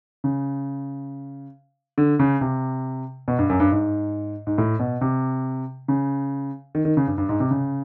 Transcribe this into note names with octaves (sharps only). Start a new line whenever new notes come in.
C#3
D3
C#3
C3
B2
G2
F#2
G2
G#2
G#2
A2
B2
C3
C#3
D#3
D#3
C#3
G2
G2
G#2
C3
C#3